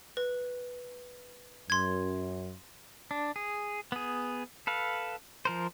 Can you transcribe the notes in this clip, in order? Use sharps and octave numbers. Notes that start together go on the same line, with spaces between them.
B4
F#2 C6 G#6
D4
G#4
B3 G#4
A4 B4 F5
F3 A#4 C5